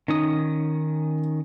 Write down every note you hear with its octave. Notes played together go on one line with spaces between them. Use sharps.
D#3 C#4 D#4 D#6